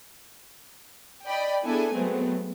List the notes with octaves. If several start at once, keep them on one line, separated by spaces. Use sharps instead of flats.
D5 D#5 G5 B5
B3 D4 E4 G#4 A4 G#5
F#3 G#3 A3 B3 C4